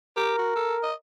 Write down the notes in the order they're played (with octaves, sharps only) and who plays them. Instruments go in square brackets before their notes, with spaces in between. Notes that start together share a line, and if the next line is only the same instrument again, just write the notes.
[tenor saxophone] G4 [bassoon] A#4
[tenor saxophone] F#4
A4
D#5